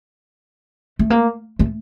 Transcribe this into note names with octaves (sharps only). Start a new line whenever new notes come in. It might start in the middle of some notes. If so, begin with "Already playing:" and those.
A3
A#3
A3